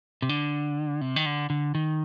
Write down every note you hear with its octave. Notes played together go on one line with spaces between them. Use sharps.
C3
D3
C3
D#3
D3
D3
D#3